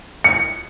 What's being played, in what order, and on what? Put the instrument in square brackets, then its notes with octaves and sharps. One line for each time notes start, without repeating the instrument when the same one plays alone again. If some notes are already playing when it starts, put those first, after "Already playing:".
[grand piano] C#7